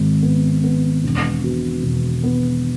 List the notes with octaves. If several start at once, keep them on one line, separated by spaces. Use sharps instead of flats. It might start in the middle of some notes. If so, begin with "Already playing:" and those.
Already playing: G#1 G#3
B3
B3
E1
B2
E1
B3